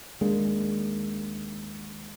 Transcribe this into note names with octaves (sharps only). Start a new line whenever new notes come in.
D#2 G#3 A#3 D4